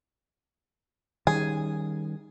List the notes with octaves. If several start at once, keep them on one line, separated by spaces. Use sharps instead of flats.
D#3 G3 C#4 G#4